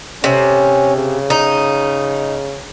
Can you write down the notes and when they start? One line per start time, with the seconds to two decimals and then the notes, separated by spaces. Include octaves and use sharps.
0.24 C3 C#4
0.96 C#3
1.30 D#4